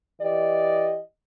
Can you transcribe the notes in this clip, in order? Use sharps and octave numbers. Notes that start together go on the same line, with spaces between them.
E3 G4 D5 D#5